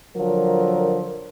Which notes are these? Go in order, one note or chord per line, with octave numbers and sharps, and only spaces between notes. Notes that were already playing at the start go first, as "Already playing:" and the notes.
D3 F3 F#3 A#4